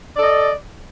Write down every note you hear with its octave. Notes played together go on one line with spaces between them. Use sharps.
A4 D5 D#5